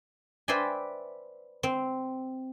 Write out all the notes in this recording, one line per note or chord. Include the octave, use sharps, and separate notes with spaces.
B4 C5 D5 E5 G5 G#5
C4